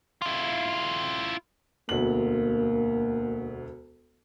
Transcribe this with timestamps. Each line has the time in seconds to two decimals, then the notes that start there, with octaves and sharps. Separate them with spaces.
0.22 E4 F4
1.89 E1 D2 A#3 F#7